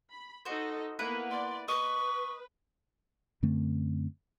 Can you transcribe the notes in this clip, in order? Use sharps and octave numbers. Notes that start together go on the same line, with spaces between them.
B5
D#4 F#4 A4 C5 D#5
A#3 B3 E4 B4 F#5
D5 C6
B4 D#5 C#6
F#2 D3 A3 C4